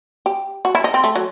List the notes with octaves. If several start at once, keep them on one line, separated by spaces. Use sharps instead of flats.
G4
F#4
E4
D#4
C4
A3
F#3